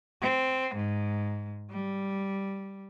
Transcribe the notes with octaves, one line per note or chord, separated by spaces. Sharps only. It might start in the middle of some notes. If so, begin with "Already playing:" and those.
C4
G#2
G3